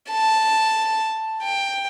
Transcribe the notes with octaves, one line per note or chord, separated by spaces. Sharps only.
A5
G5